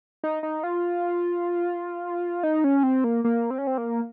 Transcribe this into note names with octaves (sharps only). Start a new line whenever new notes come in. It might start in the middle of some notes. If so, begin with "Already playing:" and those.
D#4
D#4
F4
D#4
C#4
C4
A#3
A#3
C4
C#4
C4
A#3